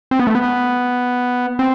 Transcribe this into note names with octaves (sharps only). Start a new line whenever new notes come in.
C4
B3
A3
B3
C4